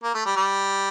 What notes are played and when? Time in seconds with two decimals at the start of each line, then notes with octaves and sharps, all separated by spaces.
0.04 A#3
0.14 A3
0.26 G3
0.36 G3